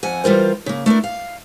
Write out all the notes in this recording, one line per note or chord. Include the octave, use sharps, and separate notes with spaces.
F2 F#5 G#5
E3 G3 F4 A#4 C5
C#3 A#3
A3 D4 E4 A#4
F5